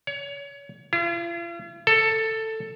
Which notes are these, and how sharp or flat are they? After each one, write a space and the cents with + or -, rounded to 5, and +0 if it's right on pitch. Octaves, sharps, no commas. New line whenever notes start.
C#5 +30
F4 -45
A4 +10